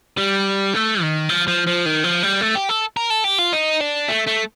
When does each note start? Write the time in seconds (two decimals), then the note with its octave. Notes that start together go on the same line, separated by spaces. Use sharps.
0.18 G3
0.74 A3
1.02 D#3
1.29 F3
1.48 F3
1.67 F3
1.85 D#3
2.04 F3
2.23 G3
2.41 A3
2.55 G4
2.69 A4
2.97 A#4
3.10 A4
3.24 G4
3.39 F4
3.53 D#4
3.80 D4
4.08 A3
4.27 A3